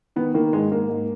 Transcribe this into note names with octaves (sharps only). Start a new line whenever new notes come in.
D#3 B3
D#3 A#3
G#2 G#3
G#2 A#3
G#2